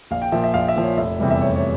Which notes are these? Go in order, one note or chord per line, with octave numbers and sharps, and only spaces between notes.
A#1 F5
G5
A#2 F3 E5
E5
A#1 F5
E5
A#2 F3
C#5
F1 E5
E2 C3 E3 G3
E5
F1 C#5
C#5